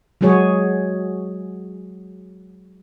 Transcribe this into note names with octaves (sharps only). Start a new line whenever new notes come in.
F#3 G#3 F#4 G#4 C#5